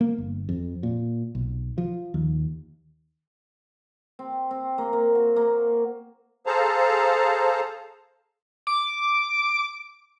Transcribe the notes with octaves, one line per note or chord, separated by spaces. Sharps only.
A#3
G1
F2
A#2
B1
F3
D#2
C4
C4
A#3
A#3
F#4
A#3
G#4 A4 C5 F5 A5 A#5
D6